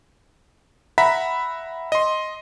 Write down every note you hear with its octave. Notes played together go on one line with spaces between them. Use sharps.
E5 F#5 A#5 B5 B6
D#5 C6